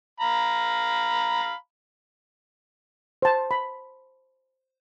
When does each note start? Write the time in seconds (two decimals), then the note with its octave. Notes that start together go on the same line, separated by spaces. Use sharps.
0.20 F5 A#5 B5
3.22 C5 A5
3.51 B5